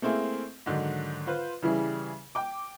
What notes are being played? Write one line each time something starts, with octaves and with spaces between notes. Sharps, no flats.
A3 A#3 C4 E4 G#4
G#2 D3 D#3 F#3
F4 B4 C5
C#3 E3 G3 E4 G#4
G5 D6